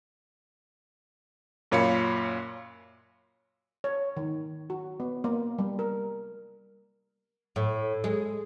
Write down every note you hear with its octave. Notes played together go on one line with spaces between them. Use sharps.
F#2 A#2 C#5 F5 B5 C#7
C#5
D#3
F#4
B3
A#3
G3
A#4
A2
G#3